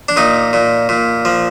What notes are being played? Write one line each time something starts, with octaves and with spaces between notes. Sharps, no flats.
D4
A#2 D#4
A#2
A#2
F3